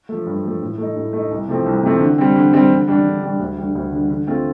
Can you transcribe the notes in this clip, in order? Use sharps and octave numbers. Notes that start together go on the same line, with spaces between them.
F3 A3
G2
F3 A3
A2
A3 D#4
A2
A3
D#4
C2
C3 F3 A3 C4
C2
C3 F3 A3 C4
D3
G3 C4
D3
G3 C4
D3
G3 D4
D3
G3 D4
D2
D3 G3
D2
D3 G3
D3
A3 C4 F4